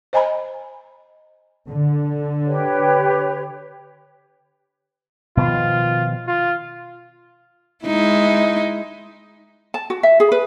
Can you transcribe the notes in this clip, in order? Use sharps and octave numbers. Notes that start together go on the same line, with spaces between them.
C5 D#5 G#5 A#5 B5
D3
G4 B4 C#5
B2 D#3 F3 F4
F4
G#3 D#4 E4
A5
F#4
E5
G#4
B4